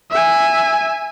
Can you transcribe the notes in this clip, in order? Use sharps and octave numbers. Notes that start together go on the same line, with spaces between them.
E5 G#5